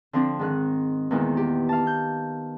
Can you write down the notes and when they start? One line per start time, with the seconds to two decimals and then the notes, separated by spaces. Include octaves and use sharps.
0.13 D3 F3 C4 D4
0.39 G#2 D#3 F#6
1.11 E2 A#2 D#3 G#3 B3
1.37 G4
1.69 F5 A5
1.87 G6